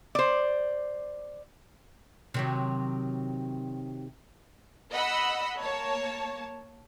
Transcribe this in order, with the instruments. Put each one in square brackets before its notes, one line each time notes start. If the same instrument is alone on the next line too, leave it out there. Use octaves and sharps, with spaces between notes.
[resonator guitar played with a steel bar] C5 D5
[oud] C3 D#3 F#3
[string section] D#5 F#5 B5 E6
A#3 C#5 A5